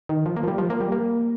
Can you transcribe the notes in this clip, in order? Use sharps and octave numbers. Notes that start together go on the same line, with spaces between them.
D#3
F3
A#3
F3
G3
F3
A#3
G3
A#3